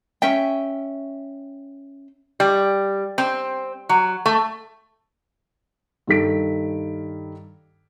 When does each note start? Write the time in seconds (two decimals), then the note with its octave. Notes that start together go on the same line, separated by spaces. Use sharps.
0.22 C#4 E5 G5
2.40 G3
3.18 C4
3.89 F#3
4.26 A3
6.07 G2 D#3 A4 B6 D7